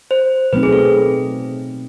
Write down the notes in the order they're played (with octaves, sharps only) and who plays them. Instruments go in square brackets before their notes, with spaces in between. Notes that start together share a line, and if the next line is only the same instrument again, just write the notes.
[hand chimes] C5
[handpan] B2 F#3 A3 C4 D#4 [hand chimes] B4
[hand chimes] G#4
A4